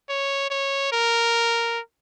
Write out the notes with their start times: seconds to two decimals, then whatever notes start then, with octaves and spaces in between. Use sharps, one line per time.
0.09 C#5
0.50 C#5
0.92 A#4